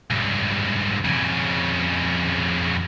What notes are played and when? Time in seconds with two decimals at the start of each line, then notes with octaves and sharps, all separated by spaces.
0.11 C#2 G2
1.05 F2 C#3